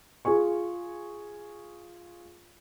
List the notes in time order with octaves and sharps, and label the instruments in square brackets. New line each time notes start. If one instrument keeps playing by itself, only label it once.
[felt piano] F4 G#4 G#5 C#6